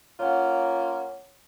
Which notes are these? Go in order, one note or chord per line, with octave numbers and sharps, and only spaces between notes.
A#3 C#4 F4 C#5 F#5